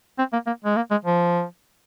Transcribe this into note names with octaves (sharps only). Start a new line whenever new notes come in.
C4
A#3
A#3
G#3
A#3
G#3
F3